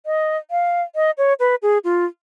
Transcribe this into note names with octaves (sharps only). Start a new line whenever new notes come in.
D#5
F5
D#5
C#5
B4
G#4
F4